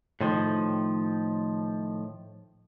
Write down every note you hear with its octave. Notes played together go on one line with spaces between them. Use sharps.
A2 D#3 F3